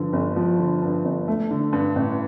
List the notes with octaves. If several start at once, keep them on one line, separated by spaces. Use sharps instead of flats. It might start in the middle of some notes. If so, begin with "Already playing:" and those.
Already playing: G2 D3 F3
G1
F3
D3
G2
G1
A3
D3
G2
A1